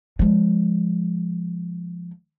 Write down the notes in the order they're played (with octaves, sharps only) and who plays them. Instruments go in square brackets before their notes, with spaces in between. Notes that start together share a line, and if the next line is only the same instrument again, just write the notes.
[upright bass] F3 G#3